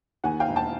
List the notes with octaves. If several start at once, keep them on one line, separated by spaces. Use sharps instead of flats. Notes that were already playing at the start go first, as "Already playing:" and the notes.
D#2 F#5 G#5
F5 G5
E1
G5 A5